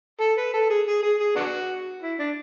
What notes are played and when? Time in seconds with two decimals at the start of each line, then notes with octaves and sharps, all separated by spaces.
0.20 A4
0.37 B4
0.54 A4
0.70 G#4
0.87 G#4
1.03 G#4
1.20 G#4
1.36 B3 D4 F#4
2.02 E4
2.19 D4